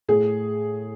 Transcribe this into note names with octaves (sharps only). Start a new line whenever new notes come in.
A2 G#4